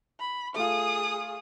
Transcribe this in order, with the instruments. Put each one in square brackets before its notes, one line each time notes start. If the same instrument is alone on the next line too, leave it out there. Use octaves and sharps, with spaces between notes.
[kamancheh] B5
[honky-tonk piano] A3 F4 [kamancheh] G#4 D#6